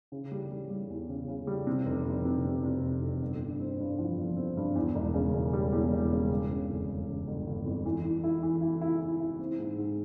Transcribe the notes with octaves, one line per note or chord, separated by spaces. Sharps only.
C#3
G3
G3
G3
E2
C#3
C#3
G3
C3
F1
C3
C3
C3
C3
F1
F2
G1
G2
C4
G2
F3
G1
C4
G2
E2
E1
C#3
E1
G3
E2
E1
C#3
G1
C#3
F2
G1
C#3
G1
G1
F2
E3
E3
E4
E3
E4
E4
E4
E4
C4
G#2
G#2